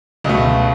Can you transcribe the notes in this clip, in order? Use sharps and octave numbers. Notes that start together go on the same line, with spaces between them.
C#2 B2 A3